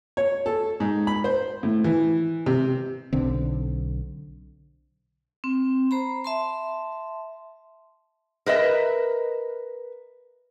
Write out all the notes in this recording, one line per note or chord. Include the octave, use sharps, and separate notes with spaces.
C#5
A4
G#2
B5
C5
A2
E3
C3
B1 D3 C4
C4
C5 A#5 B5
E5 A5 C6
A#4 B4 D#5 E5